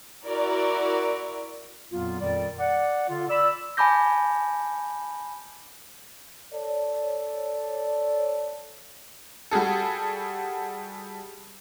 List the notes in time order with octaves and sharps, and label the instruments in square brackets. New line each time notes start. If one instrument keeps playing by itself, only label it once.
[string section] E4 F#4 A#4 D5
[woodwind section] F2 A#2 F#3 B3 F4
F2 A#2 D#3 G3 D5
D5 F#5
D3 F4
D5 B5 E6
[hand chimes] G#5 A5 B5 D6 G6 A#6
[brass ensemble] A4 C#5 D5
[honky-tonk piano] G3 F#4 G#4 A4